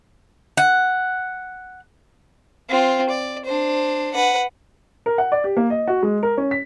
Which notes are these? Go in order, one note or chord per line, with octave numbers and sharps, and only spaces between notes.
F#5
C4 F4
D5
D4 C5
B4 F#5
A#4
F#5
D5
G4
A#3
D#5
F#4
G#3
A#4
C#4
B6